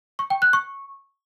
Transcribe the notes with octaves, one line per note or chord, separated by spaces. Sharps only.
C#6
G5
F#6
C#6